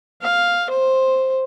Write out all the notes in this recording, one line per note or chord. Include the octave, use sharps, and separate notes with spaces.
F5
C5